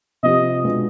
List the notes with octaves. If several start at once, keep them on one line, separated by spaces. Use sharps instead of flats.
C3 F3 C4 G4 D#5
B2 G#3 B3 D4 F4